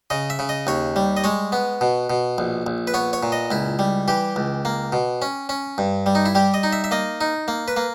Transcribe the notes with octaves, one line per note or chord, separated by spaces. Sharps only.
C#3 D#5
E5
C#3
D#5
D#2 C#5
G3
D#5
G#3 C#5
B3
B2
B2
A#1
A#1
B4
B3 C#5
C#5
A#2
D#5
C#2 E4
G3
E3 G4
C#2
A#3
B2
C#4
C#4
G2
G3
D#4
E4
G3 G4
D#5
D#4
E5
E5
A#3 D#5
D#4
A#3
B4
A#3